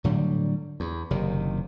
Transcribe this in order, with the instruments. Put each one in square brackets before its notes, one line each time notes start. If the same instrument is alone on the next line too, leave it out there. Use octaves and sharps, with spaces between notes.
[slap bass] A2 D3 F#3 G3
E2
F#1 C3 D#3